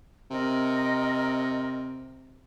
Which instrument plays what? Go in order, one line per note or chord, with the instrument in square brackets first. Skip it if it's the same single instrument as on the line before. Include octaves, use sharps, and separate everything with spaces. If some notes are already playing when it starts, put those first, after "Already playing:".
[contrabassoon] C3 [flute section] A#4 D#5